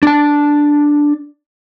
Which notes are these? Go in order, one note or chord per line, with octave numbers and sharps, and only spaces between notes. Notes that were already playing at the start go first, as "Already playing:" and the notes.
D4 A5